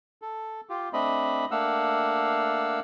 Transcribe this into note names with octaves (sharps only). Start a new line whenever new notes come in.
A4
F4 G4
A3 C4 D4 D#5 B5
A3 A#3 D4 F5 F#5 E6